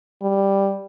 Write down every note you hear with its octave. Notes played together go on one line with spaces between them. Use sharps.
G3